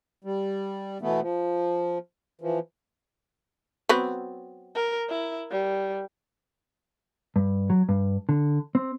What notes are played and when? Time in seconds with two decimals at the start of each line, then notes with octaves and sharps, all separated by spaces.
0.24 G3
1.01 B2 E3 A3 B3
1.21 F3
2.41 E3 F3
3.89 F#3 B3 C4
4.75 A#4
5.09 E4
5.51 G3
7.36 G2
7.70 F#3
7.89 G2
8.29 D3
8.75 C4